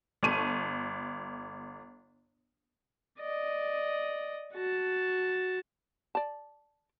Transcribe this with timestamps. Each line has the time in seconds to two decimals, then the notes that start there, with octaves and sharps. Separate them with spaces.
0.23 G1 A5 C#6 D#7
3.19 D5 D#5
4.53 F#4 A5
6.15 D5 A5